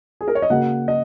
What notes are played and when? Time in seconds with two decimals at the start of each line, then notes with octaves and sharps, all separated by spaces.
0.21 G#4
0.28 A#4
0.35 C#5
0.42 D#5
0.50 C#3 A#3 F#4 F#5
0.88 D#5